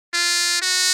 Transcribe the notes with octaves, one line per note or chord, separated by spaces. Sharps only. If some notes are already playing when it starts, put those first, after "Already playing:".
F4
F#4